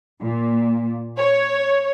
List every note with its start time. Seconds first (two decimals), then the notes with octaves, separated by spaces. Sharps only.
0.21 A#2
1.18 C#5